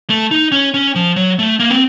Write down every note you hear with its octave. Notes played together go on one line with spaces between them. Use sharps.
A3
D#4
C#4
C#4
F3
F#3
A3
A#3
C4